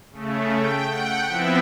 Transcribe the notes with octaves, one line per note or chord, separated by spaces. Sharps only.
C#3 A3
G5
F#5 G5
F3 B3 C4 E4 E5